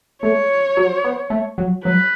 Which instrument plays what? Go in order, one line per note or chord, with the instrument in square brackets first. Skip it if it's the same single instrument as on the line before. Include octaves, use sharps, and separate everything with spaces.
[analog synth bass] A3 [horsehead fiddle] C#5
[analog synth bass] F#3
B3
A3
F#3
[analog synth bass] F#3 [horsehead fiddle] B4